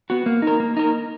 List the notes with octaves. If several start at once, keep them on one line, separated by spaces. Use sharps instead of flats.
B3 F#4
A#3
D#4 A#4
A#3
D#4 A#4